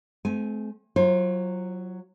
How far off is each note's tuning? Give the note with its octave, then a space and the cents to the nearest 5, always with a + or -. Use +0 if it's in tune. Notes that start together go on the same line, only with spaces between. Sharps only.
A3 -45 C4 -20 G#5 +0
F#3 +0 F4 -15 C5 +40